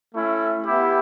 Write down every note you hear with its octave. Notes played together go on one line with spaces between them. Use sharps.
A3 C#4 E4
B3 E4 G4